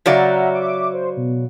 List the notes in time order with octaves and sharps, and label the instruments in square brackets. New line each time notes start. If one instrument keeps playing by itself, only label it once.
[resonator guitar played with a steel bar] C#3 F#3 D5 [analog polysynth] E5 F#5 A#5
[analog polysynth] E5 D6
C5
B2